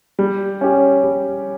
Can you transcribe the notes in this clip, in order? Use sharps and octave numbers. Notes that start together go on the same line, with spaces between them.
G3
C#4 G4 C#5
G3